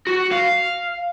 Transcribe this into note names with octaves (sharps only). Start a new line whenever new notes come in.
F#4
F5